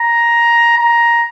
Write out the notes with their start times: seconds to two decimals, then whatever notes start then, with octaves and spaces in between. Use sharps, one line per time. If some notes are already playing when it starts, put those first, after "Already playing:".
Already playing: A#5
0.78 A#5